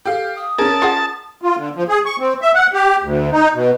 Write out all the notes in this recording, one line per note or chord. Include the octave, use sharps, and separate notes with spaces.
G4 A4 F5
D#6
C#4 G#4 A#4 A5
F4 G#4 F#5
F4
D3
F3
G#4
C#6
C4
E5
F#5
G4
D2
D#4
B2